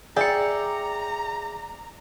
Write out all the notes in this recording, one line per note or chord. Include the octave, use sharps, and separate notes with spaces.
G#4 D5 E5 G5 A#5 E6 C#7